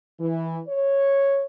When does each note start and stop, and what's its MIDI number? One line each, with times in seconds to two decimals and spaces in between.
0.19 0.59 52
0.67 1.44 73